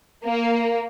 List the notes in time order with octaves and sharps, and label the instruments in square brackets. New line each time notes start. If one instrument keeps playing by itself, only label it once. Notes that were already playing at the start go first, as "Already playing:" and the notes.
[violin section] A#3